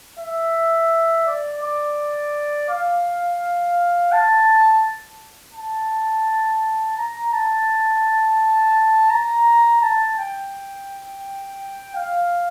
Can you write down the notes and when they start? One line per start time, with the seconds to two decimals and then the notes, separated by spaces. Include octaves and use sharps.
0.19 E5
1.27 D5
1.63 D5
2.69 F5
4.12 A5
5.54 A5
6.98 A#5
7.33 A5
9.11 A#5
9.82 A5
10.18 G5
11.95 F5